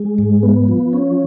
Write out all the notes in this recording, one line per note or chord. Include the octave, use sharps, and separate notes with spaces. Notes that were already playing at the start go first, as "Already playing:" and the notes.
Already playing: G#3
G#2
B3
F3
C#4